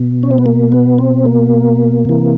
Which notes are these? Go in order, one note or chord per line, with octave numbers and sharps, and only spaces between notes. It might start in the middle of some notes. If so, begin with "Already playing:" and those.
Already playing: B2
C#4
C4
B3
A#3
B3
C4
A#3
C3 E3